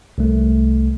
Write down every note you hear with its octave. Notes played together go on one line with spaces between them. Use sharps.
C2 A3